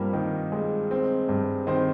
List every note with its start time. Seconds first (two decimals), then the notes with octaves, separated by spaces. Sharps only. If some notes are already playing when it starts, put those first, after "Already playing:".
Already playing: G2 F3 G3 A#3 C4 G4 A#4
0.13 D#3
0.52 G#3
0.91 C4
1.29 G2
1.67 D#3 C4 C5